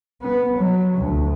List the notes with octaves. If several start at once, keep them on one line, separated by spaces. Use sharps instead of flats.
B3
F#3
D2